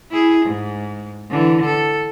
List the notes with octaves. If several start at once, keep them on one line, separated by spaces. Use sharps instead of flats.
E4 G#4
G#2
D3 E3
A4